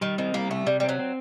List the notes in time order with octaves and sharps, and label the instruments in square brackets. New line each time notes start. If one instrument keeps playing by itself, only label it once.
[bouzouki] D#3 [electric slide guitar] G3
[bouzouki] D#3 [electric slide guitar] C4
[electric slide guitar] G3 [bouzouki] A#3
[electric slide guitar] C3 [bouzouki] A3
[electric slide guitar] C3 [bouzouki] G3
[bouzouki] G3 [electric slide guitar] C4
[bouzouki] F#3
[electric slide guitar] C4